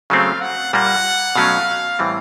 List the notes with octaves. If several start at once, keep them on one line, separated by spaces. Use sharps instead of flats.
C#3 F#3 A3 C4 F5
F#5
A#2 G3 A#3 F#5
B2 F#3 A3 C#4 F5
A2 E3 G3 C4